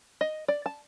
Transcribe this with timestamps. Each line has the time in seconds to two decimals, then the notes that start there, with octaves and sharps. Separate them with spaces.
0.21 D#5
0.48 D5
0.66 A5